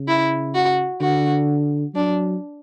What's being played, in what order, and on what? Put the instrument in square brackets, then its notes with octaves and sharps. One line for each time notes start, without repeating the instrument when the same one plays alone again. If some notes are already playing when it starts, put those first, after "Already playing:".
Already playing: [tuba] C#3
[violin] E4
F#4
[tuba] D3 [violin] F#4
[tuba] F#3 [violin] D4